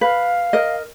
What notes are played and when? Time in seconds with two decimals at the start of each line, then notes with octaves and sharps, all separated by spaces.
0.01 B4 F5
0.53 A#4 D#5